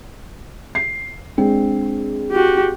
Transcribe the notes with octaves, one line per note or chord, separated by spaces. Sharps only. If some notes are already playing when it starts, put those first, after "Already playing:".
C7
G#3 C4 D4
F#4 G4